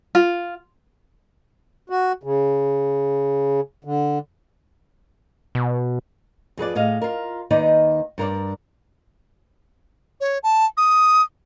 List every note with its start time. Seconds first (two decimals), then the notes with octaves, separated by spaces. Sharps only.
0.15 F4
1.90 F#4
2.23 C#3
3.85 D3
5.55 B2
6.57 F2 G#4 B4 D5
6.75 A2 G#4 D#5 F5
7.02 F4 A#4
7.50 D#2 D#3 D#4 B4 D5 D#5
8.18 G2 A#4 B4 D5
10.21 C#5
10.43 A5
10.77 D#6